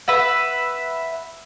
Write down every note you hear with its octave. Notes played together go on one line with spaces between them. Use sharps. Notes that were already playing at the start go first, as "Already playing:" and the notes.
B4 E5 F#5